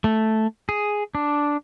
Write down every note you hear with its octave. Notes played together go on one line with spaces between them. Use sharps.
A3
G#4
D4